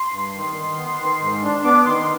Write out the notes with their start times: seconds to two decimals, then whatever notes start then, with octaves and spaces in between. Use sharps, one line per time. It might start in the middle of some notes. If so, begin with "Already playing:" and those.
Already playing: C6
0.12 G2
0.35 D#3
0.56 D#3
0.77 B3
1.00 D#3
1.21 G#2
1.43 D4
1.64 B3 D6
1.86 D#3 C6
1.97 C6